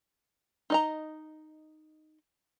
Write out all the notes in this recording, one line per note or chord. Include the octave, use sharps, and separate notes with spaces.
D#4 D#5 A#5